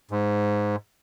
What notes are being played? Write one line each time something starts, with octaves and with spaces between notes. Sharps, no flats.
G#2